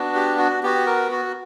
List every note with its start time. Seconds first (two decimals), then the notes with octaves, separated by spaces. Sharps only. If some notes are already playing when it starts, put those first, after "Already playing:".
Already playing: B3 D4 F#4
0.15 G4
0.38 F#4
0.63 B3 F#4 G4
0.86 A#4
1.11 F#4